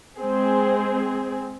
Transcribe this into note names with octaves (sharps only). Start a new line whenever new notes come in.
G#3 C4 G#4